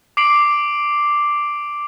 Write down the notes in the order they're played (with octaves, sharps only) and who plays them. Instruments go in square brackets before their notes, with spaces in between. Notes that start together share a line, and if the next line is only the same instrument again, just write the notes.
[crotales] D6 C7 D7 F#7